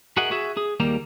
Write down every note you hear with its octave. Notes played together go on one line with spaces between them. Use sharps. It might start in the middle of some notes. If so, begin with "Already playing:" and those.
F#4 G#4 A#4 D#5 E5 F#5
F#4 G#4 E5
G#4
D#2 G3 A#3 A#5